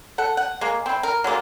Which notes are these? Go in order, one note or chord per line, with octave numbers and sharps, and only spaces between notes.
A4 F#5
F#5
G#3 A#3
C4 E4
A#4
F#3 G#3 A#3 F4